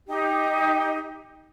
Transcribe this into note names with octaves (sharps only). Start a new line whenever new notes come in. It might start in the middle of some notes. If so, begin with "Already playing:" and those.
D#4 G4